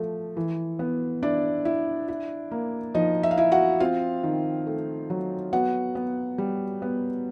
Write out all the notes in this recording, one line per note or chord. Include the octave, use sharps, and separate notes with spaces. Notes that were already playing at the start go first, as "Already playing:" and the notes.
Already playing: F3 A3
E3
B3
D4 E4 D5
E4
E4
A#3
F3 D#4 D#5
E5
F5
E4 E5
F#4 F#5
C4 F4 F5
D#3
A3
F#3
B3 F#4 F#5
B3
G3
B3